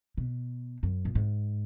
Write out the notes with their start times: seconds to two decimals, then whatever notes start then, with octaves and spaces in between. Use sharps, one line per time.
0.17 B2
0.83 F#2
1.05 A#2
1.15 G#2